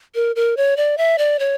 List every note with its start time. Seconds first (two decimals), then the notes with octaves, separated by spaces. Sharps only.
0.15 A#4
0.36 A#4
0.57 C#5
0.77 D5
0.98 E5
1.18 D5
1.39 C#5